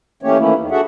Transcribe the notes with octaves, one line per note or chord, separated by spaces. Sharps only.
E3 A3 A#3 C#4 G4 C#5
D#3 E3 A3 A#3 C#4 E4
E2 D#3
D4 F#4 G#4 A4 E5 F#5